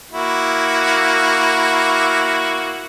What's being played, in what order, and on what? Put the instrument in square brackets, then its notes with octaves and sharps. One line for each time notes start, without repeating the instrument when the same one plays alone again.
[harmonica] A#3 E4 F#4